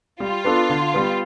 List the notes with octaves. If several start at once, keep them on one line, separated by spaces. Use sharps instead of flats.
G3 F4
B3 D4 A4
D3
G3 B3